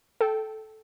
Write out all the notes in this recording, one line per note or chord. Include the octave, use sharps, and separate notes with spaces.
A4 G5